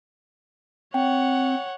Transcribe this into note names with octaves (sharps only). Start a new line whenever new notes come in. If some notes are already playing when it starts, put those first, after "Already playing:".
C4 C#5 F#5 G5